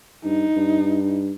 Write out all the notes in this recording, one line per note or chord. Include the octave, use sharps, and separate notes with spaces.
G2 D#4
G2